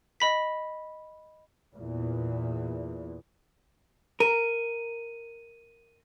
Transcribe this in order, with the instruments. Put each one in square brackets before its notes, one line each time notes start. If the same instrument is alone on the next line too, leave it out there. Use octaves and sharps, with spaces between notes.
[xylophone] D#5 B5 B6
[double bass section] E2 A#2
[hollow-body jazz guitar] A#4 [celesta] D#7